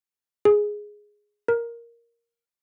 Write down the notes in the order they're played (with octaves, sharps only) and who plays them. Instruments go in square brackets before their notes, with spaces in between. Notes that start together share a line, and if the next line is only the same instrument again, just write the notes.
[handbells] G#4
A#4